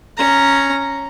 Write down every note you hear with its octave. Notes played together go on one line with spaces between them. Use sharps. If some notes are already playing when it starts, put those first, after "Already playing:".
C#4 A#5